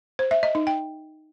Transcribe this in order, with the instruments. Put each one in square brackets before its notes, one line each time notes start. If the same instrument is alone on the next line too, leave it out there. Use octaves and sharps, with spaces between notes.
[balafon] C5
E5
D#5
D#4
G5